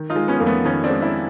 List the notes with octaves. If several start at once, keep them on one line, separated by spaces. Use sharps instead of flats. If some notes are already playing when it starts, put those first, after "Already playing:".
Already playing: D#3
D#4 F4
G#3
B3 C#4
F2 A#3
A3 B3
D#3 B3 C#4
C4 D4
G#3
D4 E4